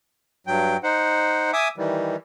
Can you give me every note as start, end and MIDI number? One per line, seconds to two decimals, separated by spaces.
0.47 0.77 43
0.47 0.77 54
0.47 0.77 79
0.83 1.51 63
0.83 1.51 72
0.83 1.51 78
1.53 1.68 76
1.53 1.68 80
1.53 1.68 86
1.53 1.68 87
1.78 2.16 51
1.78 2.16 52
1.78 2.16 55